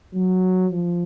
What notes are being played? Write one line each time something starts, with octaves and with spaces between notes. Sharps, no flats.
F#3
F3